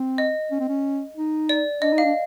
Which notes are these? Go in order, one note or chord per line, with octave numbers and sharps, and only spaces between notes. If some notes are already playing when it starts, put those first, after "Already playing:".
Already playing: C4
D#5
C#4
C4
C#4
D#4
D5
D4 D#5
D#4
F5
D4